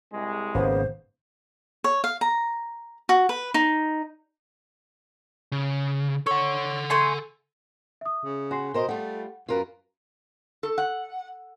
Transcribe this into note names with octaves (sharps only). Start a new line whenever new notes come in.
C2 G#3
G#1 C#3 A#3 B3 C5
C#5
F5
A#5
F#4
B4
D#4
C#3
A4 C#5 F#5
A3 G#5 C6
E5 D#6
C#3
F#4 G#5 C6 C7
B2 A#4 C5 D#5
G3 A3 F4 F#5
F#2 F4 A#4 B4
A4
F#5